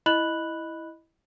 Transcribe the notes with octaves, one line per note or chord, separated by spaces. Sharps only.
E4 D#5 B5 F#6 F#7